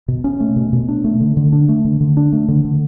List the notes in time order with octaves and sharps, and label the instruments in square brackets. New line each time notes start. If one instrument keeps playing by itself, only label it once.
[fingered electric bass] B2
C#4
A3
B2
B2
D4
A3
D3
D3
D4
A3
D3
D3
D4
A3
D3
D3